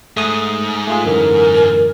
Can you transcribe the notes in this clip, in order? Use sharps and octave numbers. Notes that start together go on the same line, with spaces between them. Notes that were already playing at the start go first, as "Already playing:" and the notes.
G#2 A3 D#6
A3 F4 G#4
F#2 D3 E3 A#4